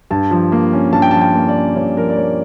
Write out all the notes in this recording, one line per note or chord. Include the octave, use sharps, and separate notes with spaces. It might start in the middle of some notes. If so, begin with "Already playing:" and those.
G2 A5
F3
A#3
C#4
G2 A5
G5
F3 A5
G5
A#3
D5
C#4
G2 C#5
F3 A#4
D5
A#3 C#5